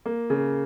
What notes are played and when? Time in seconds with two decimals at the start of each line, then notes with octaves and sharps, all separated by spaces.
0.06 A#3
0.30 C#3